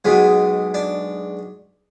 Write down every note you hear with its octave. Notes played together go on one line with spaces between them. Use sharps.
B1 B2 G#3
D4